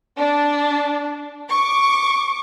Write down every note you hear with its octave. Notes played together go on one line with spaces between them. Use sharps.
D4
C#6 D6